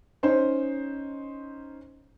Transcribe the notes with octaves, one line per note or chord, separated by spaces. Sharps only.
C#4 D#4 C5